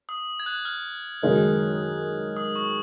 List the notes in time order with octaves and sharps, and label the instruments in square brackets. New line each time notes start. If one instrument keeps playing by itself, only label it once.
[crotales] D#6
G#6
F#6
F6
[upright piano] F#2 D#3 G#3 D#4
[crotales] D#6
C#6